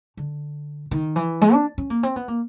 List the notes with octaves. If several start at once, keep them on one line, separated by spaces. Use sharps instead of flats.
D3
D#3
E3
G#3
D4
C#4
A#3
C4
B3
A#3